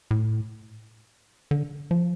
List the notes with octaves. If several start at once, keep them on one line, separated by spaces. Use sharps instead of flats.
A2
D3
F3